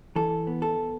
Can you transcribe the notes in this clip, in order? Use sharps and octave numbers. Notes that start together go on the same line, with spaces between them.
E3 A4
B3
A4